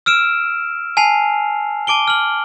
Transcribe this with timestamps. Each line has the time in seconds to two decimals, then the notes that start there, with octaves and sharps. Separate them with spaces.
0.06 E6 F6 D7 E7
0.97 G#5 A5 C7 F7
1.87 A5 D6 D7 G7
2.08 F6 F#7